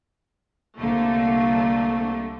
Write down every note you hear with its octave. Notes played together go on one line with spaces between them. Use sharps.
C2 D3 A3 A#3